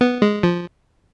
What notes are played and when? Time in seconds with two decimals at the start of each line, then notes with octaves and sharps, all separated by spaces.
0.01 B3
0.22 G#3
0.43 F3